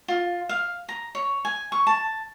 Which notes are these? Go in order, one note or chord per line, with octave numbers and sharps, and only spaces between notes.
F4
F5
A#5
C#5
G#5
C#6
A5